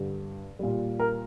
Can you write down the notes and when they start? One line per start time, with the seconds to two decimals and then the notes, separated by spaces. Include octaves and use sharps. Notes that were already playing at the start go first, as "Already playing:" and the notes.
Already playing: G2 D3 G3
0.59 A#2 G3
1.00 A#4